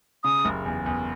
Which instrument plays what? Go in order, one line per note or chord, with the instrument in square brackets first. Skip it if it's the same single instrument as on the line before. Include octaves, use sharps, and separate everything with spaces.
[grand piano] C#3 [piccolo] D#6
[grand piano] F#1
E2
E2